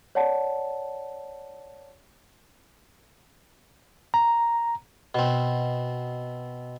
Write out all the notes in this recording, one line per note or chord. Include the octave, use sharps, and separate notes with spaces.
C#5 D5 F#5 A5
A#5
B2 C4